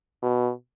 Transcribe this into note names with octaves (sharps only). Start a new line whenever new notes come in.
B2